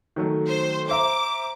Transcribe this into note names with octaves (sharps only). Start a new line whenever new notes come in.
D#3 F#3 A3
C5
C5 E5 A#5 D6